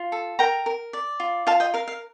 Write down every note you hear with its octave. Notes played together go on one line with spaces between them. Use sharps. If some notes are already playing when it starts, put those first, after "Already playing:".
Already playing: F4
A4
A#4 G5 A#5
A#4
D5
F4
F4 F5 A5
D#5 G5
A#4 F5
F5